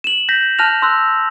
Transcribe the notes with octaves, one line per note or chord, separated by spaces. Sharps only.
E7 F#7
G6 A#6 B6
A5 F6 F#6 A#6 F7
C6 E6 F#6